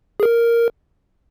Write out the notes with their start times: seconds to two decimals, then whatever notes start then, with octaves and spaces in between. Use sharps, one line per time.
0.20 G#4
0.23 A#4